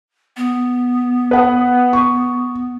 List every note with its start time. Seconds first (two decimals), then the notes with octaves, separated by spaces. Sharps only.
0.37 B3
1.31 B4 F#5 D#6
1.93 C#6